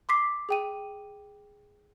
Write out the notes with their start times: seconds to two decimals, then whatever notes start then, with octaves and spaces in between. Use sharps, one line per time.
0.09 C6 D6 B6 C7
0.49 G#4 G5 D#7